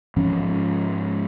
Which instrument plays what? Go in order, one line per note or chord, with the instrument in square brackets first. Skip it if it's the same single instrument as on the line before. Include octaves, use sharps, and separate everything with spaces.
[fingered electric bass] G#2 F3 C#4